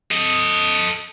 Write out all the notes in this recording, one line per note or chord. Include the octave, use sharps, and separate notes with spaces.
A4 D#5